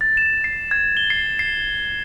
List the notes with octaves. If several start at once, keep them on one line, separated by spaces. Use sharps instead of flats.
A6
E7
C7
G#6
G7
C7
C7